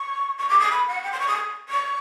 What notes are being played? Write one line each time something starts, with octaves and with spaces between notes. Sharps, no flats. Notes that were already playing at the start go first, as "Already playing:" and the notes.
Already playing: C#6
C#6
D6
D#6
B5
F#5
G5
C6
C#6
D#6
C#6